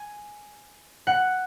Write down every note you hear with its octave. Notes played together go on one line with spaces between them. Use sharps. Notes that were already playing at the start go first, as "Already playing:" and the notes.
Already playing: G#5
F#5